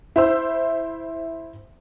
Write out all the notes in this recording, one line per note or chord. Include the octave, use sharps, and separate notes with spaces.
E4 C5 E6